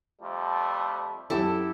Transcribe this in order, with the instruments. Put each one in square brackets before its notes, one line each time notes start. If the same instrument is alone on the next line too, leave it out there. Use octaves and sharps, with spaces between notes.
[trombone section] F2 G3 A3
[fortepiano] F#2 G4 A5 [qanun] E4 [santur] A4 E6